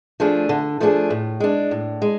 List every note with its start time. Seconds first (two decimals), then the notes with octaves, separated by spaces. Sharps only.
0.20 F3 A3 D4 G#4
0.49 D3
0.80 F3 A3 D4 G#4
1.10 A2
1.40 G#3 D4
1.71 A2
2.02 G#3